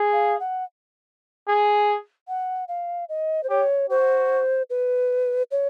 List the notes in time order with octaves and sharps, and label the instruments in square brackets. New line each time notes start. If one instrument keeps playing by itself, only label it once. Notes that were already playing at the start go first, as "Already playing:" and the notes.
Already playing: [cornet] G#4
[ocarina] F5
F#5
[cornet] G#4
[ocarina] F#5
F5
D#5
C5
[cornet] G4 [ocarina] C#5
[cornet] F#4 [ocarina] C5
[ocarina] B4
C#5